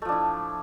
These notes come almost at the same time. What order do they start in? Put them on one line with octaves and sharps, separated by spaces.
A3 F3 D4 E4